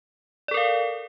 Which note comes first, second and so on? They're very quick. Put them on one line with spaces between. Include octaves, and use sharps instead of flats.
D5 A4 A#4 F5